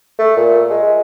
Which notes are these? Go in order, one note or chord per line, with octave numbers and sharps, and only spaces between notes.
A3
A#2
G#3